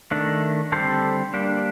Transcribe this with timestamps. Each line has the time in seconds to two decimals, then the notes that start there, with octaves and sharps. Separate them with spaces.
0.11 D#3 A3 D4
0.72 D3 G3 C4 A4 C5
1.34 G3 A#3 D4